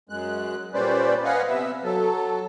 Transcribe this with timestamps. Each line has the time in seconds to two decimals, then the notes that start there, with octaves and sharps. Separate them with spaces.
0.09 F#2 G#3 F#6
0.74 A#2 G3 C#4 B4 C5 D5
1.24 B4 D#5 F5 F#5 G#5
1.48 C3 B3 E5
1.84 F#3 A4